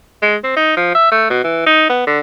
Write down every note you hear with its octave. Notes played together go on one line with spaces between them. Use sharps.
G#3
C4
D#4
F3
E5
A3
B2
E3
D#4
B3
D3